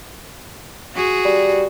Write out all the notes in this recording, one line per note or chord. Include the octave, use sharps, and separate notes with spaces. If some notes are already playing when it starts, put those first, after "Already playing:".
F#4 G#4
G3